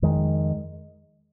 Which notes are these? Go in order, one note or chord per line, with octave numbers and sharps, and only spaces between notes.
F2 D#3 G#3